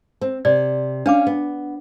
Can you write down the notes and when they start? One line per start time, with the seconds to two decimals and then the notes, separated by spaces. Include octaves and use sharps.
0.21 C4
0.45 C3 D5
1.06 C#4 D4 F5 D6
1.27 B3